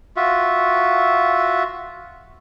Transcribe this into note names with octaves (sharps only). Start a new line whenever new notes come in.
F4 F#4 E5